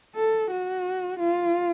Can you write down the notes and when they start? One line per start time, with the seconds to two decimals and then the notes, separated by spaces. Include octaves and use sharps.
0.15 A4
0.51 F#4
1.19 F4